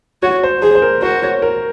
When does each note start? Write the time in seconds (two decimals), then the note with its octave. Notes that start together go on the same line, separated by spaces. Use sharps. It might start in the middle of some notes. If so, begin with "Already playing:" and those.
0.22 F#4 C#5
0.43 C5
0.62 G#4 C5
0.75 C5
0.82 A#4
1.02 F#4 C5
1.23 C#5
1.42 A#4